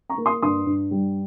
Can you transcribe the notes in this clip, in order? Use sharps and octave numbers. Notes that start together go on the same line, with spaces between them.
A#5 C#6
A#3
C6 D#6
G2 C6 D#6
G2
G3